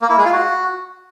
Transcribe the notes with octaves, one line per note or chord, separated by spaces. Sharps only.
A#3
E4
G#3
F4
F#4